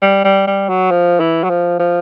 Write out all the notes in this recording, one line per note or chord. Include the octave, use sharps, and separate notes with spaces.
G3
G3
G3
F#3
F3
E3
F#3
F3
F3